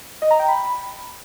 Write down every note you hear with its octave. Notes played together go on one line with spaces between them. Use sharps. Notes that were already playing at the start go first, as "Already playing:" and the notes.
D#5
A#5
G5
B5